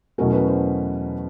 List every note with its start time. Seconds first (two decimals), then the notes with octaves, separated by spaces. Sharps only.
0.18 E2 B2 F#3 A3 C#4 A#4
0.33 B4
0.48 C5